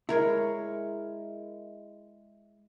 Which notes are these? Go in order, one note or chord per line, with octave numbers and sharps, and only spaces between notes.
G#3 E4 A#4 C#5